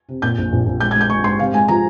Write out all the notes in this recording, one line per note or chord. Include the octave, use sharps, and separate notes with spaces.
C3
A#2 G6
A#1
A#1
A#1
G#3 G6
G#6
G#3
G6
G#3 C#6
G#2 C6
C3 F5
G#3 G#5
F3 A#5